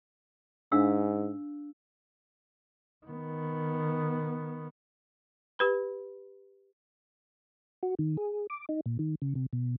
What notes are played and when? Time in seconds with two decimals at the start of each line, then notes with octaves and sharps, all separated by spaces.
0.72 G#2 D4 F5 E6
3.06 D#3 B3
5.59 G4 B4 B5
7.83 F#4
7.99 D#3
8.17 G#4
8.50 D6
8.69 D#4
8.86 A#2
8.99 D#3
9.22 C#3
9.35 C3
9.53 B2